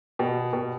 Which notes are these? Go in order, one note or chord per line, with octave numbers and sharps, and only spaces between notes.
B2
B2